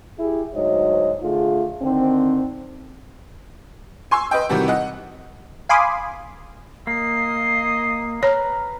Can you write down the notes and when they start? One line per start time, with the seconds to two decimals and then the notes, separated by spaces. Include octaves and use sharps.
0.18 E4 G4 G#4
0.53 D2 G#2 F#3 C#5 D#5
1.22 D3 A3 F4 G#4
1.82 D3 D#3 C4
4.11 G#5 C6 C#6 E6
4.31 B4 D#5 G5
4.49 C3 D#3 E3 G3 F#4 G4
4.68 D#5 F#5
5.69 F5 G#5 B5 C6 D6 D#6
6.87 A#3 D#5 C7
8.23 B4 C#5 A#5 F6